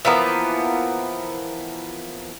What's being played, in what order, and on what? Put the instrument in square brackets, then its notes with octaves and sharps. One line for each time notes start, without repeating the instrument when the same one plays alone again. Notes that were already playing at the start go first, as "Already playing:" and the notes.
[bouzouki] E3 F3 A#3 B3